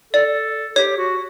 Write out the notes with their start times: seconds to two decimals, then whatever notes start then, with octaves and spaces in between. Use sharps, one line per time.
0.13 A4 D5
0.76 G4 C#5
0.98 F#4